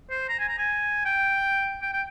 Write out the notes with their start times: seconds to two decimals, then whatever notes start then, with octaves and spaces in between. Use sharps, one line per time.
0.10 C5
0.29 A#5
0.39 G#5
0.48 A#5
0.58 G#5
1.05 G5
1.82 G5
1.93 G5